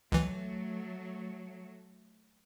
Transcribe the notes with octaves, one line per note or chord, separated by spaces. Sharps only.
C#2 E3 F#3 A3